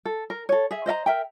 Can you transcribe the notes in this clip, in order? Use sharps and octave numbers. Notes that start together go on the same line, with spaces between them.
A4
A#4
A4 C#5
G#4 E5
C5 D#5 E5 A#5
A#4 E5 G5